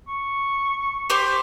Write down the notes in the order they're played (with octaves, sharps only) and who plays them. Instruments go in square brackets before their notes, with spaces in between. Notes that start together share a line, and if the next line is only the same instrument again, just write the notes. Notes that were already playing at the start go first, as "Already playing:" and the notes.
[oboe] C#6
[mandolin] G4 C5 D6